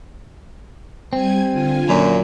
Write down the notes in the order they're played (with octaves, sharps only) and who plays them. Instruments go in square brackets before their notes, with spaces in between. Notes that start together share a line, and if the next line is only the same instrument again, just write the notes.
[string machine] G3 G#5 G#6 [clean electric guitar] C4
[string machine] D3 F4 G#5
[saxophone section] F#2 A#2 [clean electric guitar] F#3